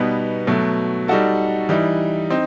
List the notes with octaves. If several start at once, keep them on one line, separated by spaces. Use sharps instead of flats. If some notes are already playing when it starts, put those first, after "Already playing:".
Already playing: B2 G3 B3 D#4
B2 F#3 A3
G3 D#4 F#4 A4
E3 G3 D#4
C4 D#4